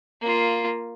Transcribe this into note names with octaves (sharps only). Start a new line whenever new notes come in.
A#3 F4